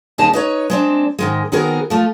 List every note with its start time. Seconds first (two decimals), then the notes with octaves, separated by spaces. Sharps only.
0.18 D#2 A#2 G3 D#4 G#4 A5
0.33 D#4 B4 C#5
0.70 G#3 C4 D4
1.19 G#2 D#3 G#3
1.52 D#3 B3 C4 F#4 G#4 A#4
1.90 F3 A3 F4